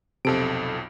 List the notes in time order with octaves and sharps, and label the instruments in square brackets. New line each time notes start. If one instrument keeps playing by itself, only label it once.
[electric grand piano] B1 F2 D7 [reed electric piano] C3 A4